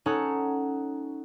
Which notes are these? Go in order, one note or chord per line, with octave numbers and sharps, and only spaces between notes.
C#4 D#4 A4 C#5 F#5 A#5